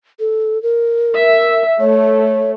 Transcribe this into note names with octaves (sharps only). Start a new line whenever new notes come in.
A4
A#4
E5
A3 C#5